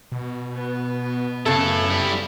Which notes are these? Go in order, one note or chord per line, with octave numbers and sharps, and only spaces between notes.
B2
B3
F#2 C#3 E4 A4 A5
G3 E4